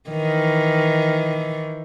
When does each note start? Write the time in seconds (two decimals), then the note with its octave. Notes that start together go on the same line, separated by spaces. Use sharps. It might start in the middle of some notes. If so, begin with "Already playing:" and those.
0.10 D#3 E3